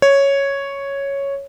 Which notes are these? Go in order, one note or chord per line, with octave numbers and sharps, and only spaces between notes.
C#5